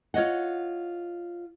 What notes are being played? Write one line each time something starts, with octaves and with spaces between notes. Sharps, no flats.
F4 C#5 D#5 F#5